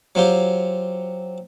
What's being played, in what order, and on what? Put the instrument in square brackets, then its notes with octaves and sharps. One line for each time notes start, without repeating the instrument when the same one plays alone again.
[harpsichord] F#3 C4 F4 G4